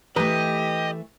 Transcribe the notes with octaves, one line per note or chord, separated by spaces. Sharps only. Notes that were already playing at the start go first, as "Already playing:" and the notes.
E3 A3 G4 B4 D#5 A#5